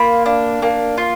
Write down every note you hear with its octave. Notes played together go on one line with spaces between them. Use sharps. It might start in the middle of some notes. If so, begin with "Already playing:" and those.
Already playing: A#3 F4 B5
D4
A#3
F4